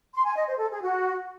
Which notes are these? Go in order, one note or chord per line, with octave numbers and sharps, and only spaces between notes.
C6
G#5
D#5
C5
A4
G#4
F#4